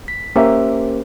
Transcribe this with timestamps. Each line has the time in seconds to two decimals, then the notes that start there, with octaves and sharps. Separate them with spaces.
0.08 B6
0.36 A#3 C#4 G4 A#4 C5 E5